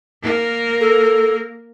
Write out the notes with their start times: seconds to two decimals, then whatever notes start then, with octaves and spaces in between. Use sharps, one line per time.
0.22 A#3 A#4
0.81 A4